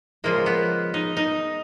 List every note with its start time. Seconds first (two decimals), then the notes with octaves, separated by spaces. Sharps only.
0.24 C#3 F3 G#3 A#3
0.46 B3
0.94 D#4
1.17 D#4